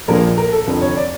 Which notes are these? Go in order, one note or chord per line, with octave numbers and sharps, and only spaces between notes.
A#1 A#2 F3 A#3 A#4
A#4
A4
F1 F2 D3 F3
C#5
D5